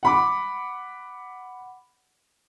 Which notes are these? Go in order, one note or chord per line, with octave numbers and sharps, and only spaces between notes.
F#5 B5 D6